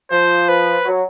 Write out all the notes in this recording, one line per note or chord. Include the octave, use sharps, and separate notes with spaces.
F3 C5
B4
F#3